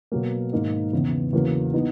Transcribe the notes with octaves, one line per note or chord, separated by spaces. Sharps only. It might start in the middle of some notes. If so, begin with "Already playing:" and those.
B2 F#3 A#3
G#2 D#3 A#3 D#4
E2 C#3 E3 B3 E4
E2 C#3 F#3 A#3
E3 B3 D#4